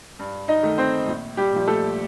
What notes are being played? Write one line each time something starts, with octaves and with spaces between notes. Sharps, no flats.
G2
D#4 D#5
D#3 A3
C4 C5
A#1
G3 G4
A#2 F3
A3 A4